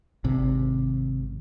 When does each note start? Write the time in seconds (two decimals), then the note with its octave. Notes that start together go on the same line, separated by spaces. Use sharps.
0.24 G#1 C3